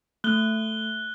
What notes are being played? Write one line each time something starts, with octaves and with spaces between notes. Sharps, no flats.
A3 F#6 G7